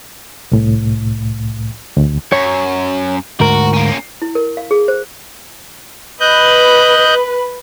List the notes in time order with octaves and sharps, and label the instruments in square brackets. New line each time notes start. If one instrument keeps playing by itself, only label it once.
[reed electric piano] C2 A2
D2
[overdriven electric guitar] F#2 [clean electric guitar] C#5
[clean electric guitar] D2 G#2 A#4 [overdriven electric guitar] F#4
[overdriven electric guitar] A#3 C#4
[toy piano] E4
A#4
F5
G#4
C5
[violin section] B4 [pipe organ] D#5 F#6 G6